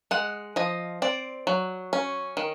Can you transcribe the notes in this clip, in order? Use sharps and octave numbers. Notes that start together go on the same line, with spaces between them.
G#3 F#5
F3 D#5
C4 D5
F#3
C#4
D#3